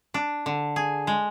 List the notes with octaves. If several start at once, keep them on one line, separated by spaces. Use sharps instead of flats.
D4
D3
G#4
G#3